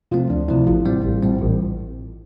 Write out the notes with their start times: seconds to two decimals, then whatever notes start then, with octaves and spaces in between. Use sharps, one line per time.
0.11 C3 F3 A3 C4 F4
0.30 D2 D4
0.48 C3 F3 A3 C4 E4
0.67 A1 F4
0.85 A2 G3 C4
1.04 A1
1.23 A2 G3 C4
1.41 A1